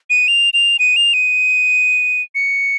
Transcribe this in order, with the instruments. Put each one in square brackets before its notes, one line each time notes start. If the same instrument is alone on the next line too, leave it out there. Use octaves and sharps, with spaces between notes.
[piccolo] D#7
F7
F7
D#7
F7
D#7
C#7